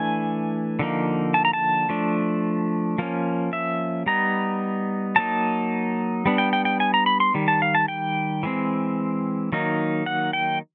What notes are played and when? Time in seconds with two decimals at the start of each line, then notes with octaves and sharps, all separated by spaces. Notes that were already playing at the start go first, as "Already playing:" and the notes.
Already playing: E3 A3 D4 G#5
0.79 D3 F3 A#3 D#4
1.34 A5
1.45 A#5
1.53 A5
1.89 F3 A3 D4
2.98 F3 A#3 C#4
3.53 E5
4.06 G3 B3 D#4 A#5
5.16 F#3 A#3 D#4 A5
6.26 G3 B3 D4
6.38 G5
6.53 G5
6.65 G5
6.80 G#5
6.94 A#5
7.06 B5
7.20 C6
7.34 D#3 G3
7.48 A5
7.62 F5
7.75 A5
7.88 G5
8.43 E3 G#3 C4
9.52 D#3 F#3 A#3 D#4
10.06 F#5
10.33 G5